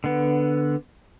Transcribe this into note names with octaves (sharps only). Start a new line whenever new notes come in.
D3 B3